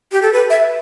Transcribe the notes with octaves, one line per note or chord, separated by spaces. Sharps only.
G4
A4
B4
E5